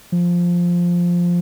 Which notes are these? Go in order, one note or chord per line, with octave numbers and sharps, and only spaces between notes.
F3